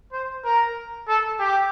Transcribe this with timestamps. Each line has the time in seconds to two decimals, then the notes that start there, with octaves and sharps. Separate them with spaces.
0.12 C5
0.45 A#4
1.08 A4
1.40 G4